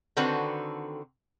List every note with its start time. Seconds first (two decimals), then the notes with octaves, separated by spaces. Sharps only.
0.17 D3 D#3 C4 F#4 A4 B4